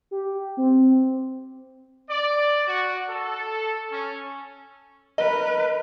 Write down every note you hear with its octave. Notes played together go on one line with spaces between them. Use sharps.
G4
C4
D5
F#4
A4
C#4
A#4 B4 D#5